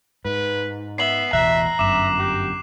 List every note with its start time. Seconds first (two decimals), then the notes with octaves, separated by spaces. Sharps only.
0.25 G#2 B4
0.98 B3 E5 C7 F#7
1.33 A1 E2 B2 E5 A#5 F#6
1.79 G1 F#2 E5 D6 E7
2.19 G4